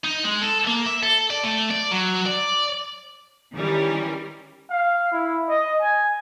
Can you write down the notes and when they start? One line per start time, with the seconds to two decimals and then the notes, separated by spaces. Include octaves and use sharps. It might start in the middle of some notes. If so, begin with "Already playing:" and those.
0.04 D#4
0.25 G#3
0.42 A4
0.67 A#3
0.86 E5
1.03 A4
1.30 D5
1.43 A3
1.71 D5
1.91 F#3
2.26 D5
3.54 D#3 E3 G3 C#4 A#4
4.70 F5
5.12 E4
5.48 D#5
5.81 G#5